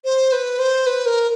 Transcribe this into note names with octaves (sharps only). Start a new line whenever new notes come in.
C5
B4
C5
B4
A#4